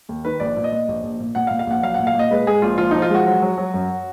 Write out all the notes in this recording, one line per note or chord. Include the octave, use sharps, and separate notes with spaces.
D#2
D#3 B4
A#1 D5
A#2
D#5
A#2
A#1
A#1
A#2
A#2 F#5
F5
A#2
F5
A#1 F#5
F#3 F5
A#2 F#5
F5
A#2
D#5
G#3 B4
G#2 G#4
A#1 F4
F3 F4
F3 D#4
F4
G#3 F#4
F#3
F#3
F#3
F#2